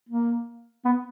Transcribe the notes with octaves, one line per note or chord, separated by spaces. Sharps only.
A#3
B3